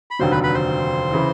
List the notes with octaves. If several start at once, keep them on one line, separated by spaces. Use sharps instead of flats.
B5
F1 D#2 D3 F#3 C5 C6
B4 B5
B4 B5
C5 C6
C#3 E3